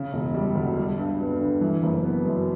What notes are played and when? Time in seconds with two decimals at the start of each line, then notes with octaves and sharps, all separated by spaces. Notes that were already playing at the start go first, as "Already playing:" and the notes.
Already playing: C#3
0.13 E1
0.34 G3
0.55 D2
0.77 G3
0.98 G2
1.20 B3
1.41 D3
1.61 E3
1.83 F#1
2.04 B3
2.25 F#2